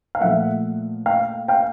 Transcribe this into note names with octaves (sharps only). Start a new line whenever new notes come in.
F5
A#2 F3 A3 E5 F#5
F5 G5
F5 G5